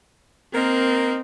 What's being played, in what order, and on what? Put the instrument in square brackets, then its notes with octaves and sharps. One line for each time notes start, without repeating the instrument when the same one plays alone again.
[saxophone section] A#3 D#4 A#4 [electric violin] C4